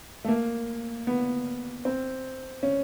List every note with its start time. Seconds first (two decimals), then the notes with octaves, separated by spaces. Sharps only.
0.25 A3
0.28 A#3
1.07 B3
1.85 C4
2.63 C#4